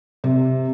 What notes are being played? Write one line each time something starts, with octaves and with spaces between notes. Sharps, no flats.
C3